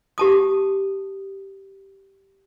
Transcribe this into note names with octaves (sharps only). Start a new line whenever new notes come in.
G4 A5 D#6